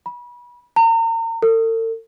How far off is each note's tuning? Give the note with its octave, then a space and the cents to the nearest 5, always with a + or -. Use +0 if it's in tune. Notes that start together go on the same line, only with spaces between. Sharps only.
B5 -30
A#5 -40
A4 +45